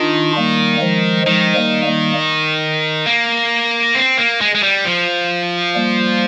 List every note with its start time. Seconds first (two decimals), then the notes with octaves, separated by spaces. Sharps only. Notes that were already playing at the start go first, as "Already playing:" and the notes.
Already playing: D#3 D4 F4
0.36 G3 A#3
0.81 F3 G#3
1.26 D#3 F3 G#3
1.56 G3 A#3
1.86 G3 A#3
3.06 A#3
3.95 C4
4.18 A#3
4.41 G#3
4.55 G#3
4.63 G3
4.85 F3
5.75 G3 A#3